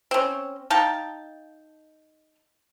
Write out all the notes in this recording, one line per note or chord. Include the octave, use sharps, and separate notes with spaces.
C4 C#4
D#4 F5 G5 A5